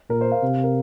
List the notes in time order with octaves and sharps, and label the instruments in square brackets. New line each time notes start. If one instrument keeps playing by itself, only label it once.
[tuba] A#2 [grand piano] A#4
[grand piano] C5
F5
[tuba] C3
[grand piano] A#4